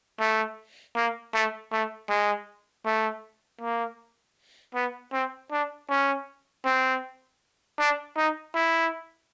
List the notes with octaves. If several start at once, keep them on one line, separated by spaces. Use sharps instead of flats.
A3
A#3
A3
A3
G#3
A3
A#3
B3
C4
D4
C#4
C4
D4
D#4
E4